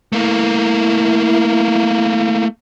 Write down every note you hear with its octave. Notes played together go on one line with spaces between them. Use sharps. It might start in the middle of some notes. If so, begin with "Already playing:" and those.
A3 A#3 E4